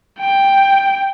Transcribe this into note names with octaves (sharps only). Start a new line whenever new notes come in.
G5